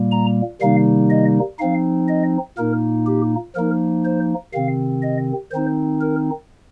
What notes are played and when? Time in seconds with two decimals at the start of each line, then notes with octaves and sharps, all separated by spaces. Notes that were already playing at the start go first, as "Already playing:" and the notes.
Already playing: A#2 G3 A#3
0.11 A#5
0.61 C3 D#3 G3 A#3 D#4 F5
1.10 D#5
1.59 F3 C4 D#4 F5
2.08 D#5
2.57 A#2 A#3 D#4 A#4
3.07 G4
3.56 F3 A#3 D#4 A#4
4.05 C5
4.53 C3 D#3 C4 F5
5.02 D#5
5.51 D#3 C4 D#4 C5
6.01 A#4